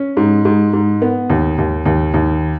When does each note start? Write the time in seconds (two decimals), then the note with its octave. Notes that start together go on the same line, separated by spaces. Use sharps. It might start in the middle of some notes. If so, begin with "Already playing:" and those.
Already playing: C#4
0.17 G#2
0.45 G#2
0.73 G#2
1.02 B3
1.30 D#2
1.58 D#2
1.86 D#2
2.14 D#2